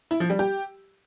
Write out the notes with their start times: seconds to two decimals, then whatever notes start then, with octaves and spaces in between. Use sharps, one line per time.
0.11 E4
0.20 F3
0.30 G3
0.39 G4